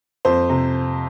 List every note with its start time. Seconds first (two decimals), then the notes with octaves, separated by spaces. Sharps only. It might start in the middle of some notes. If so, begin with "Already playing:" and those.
0.25 F2 C5
0.50 C3